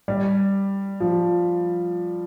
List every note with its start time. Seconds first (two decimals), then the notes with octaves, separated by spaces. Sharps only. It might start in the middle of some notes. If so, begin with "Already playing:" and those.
0.08 G3
1.00 F3